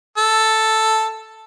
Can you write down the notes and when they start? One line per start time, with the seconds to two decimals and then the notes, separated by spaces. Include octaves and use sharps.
0.18 A4